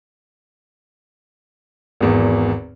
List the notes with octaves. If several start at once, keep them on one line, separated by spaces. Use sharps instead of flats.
G#1 E2